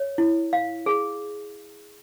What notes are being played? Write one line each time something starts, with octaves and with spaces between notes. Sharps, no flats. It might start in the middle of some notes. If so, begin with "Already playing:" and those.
Already playing: C#5
E4
F5
G#4